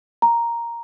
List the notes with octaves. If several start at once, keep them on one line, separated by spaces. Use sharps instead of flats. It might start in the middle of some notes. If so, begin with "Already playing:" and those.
A#5